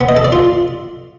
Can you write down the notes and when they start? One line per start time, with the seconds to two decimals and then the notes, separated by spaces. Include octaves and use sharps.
0.01 B3
0.09 D#5
0.17 A4
0.24 D5
0.32 F4